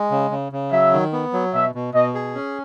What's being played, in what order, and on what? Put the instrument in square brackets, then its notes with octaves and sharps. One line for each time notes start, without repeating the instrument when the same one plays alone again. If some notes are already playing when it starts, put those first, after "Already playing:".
Already playing: [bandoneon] G#3
C#3
C#3
C#3
[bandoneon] F#3 [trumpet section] E5
[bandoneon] D#3
B3
F#3
[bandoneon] B2 [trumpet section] E5
[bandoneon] B2
[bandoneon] B2 [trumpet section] D#5
[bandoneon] G#4
C#4